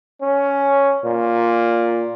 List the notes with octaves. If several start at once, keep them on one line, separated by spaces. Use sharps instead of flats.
C#4
A#2